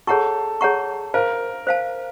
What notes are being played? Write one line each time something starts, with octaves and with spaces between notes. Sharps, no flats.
G#4 A4 C#5 F#5 A#5 C#6
G#4 C#5 F#5 A#5 C#6
A#4 C5 F5 A5
C5 F5 A5